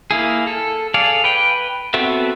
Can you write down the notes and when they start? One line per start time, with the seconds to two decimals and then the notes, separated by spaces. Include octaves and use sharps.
0.11 A#3 E4 G#4
0.47 A4
0.94 G#4 A4 D5 F5
1.24 B4 G5
1.94 B3 C4 F#4 A4 E5